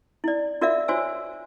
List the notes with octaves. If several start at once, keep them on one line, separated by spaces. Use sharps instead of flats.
E4 D5
F4 F#4 A#4 D5 E5 F5
F4 F#4 C5 C#5 G#5 E6